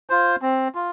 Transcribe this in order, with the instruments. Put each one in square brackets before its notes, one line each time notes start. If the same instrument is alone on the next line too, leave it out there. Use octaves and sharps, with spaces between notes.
[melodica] F4 C5
C4
F4